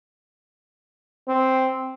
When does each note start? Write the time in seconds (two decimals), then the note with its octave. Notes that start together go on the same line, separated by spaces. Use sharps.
1.28 C4